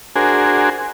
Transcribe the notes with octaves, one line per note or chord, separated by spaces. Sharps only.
D4 F#4 G#4 A#4 C5 G#5